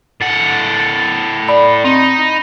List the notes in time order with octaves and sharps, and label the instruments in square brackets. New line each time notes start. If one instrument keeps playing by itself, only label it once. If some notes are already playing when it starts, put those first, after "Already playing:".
[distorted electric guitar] A2 F#5 [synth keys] A6
[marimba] D5 [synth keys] B5
[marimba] C4 [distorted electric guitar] D#4